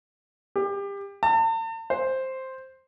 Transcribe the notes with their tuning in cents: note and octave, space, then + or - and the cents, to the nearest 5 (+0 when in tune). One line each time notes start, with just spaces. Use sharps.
G4 +30
A5 +45
C5 +5